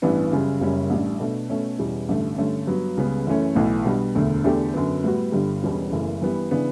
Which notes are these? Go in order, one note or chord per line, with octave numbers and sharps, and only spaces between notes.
A1 G2 E3 B3 D4
F#2 C#3 G3
F#1 F#2 C#3 G3 C#4
A1 A2 G3 D4
B2 A3 D4
B2 A3 C#4
E2 B2 G3 C#4 E4
A1 G2 D3 A3
G2 D3 A3 C#4
G2 F#3 B3
C#2 C#3 G3 B3
F#2 E3 A3 C#4
B1 A2 E3 A3
B2 G3 D4
E1 D2 D3 A3
E2 D3 A3 D4 G4
F#2 D3 F#3 B3
A2 G3 B3 F#4
G1 G2 D3 G3
E1 E2 B2 G3 C#4
F#1 F#2 C#3 E3 A3
G2 E3 G3 B3
C#3 E3 B3 D4